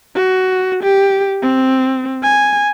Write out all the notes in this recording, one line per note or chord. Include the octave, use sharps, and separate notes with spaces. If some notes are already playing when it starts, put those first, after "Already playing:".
F#4
G4
C4
G#5